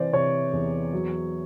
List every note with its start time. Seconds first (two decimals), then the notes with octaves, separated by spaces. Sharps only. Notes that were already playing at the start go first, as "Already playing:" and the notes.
Already playing: C3 E3 C5 D5
0.13 C3 C#5
0.53 E2
0.93 F#3